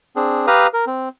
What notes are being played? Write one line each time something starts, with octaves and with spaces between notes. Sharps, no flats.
C4 D4 G#4
G4 B4 F5 A#5 D#6
A#4
C4